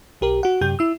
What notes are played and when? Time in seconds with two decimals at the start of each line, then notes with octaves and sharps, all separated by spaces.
0.21 B1 G4 A#4
0.43 F#4 F#5
0.61 F#2 C3 G4 G6
0.79 E4 E6